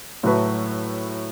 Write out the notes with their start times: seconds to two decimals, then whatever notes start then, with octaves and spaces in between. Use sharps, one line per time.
0.23 A2 F#3 A3 F#4 B4